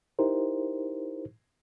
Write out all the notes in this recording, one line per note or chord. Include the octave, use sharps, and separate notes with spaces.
D#4 E4 G4 A#4 C5